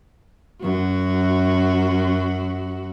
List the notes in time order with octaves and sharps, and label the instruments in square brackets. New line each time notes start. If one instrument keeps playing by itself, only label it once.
[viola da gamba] F#2 F#4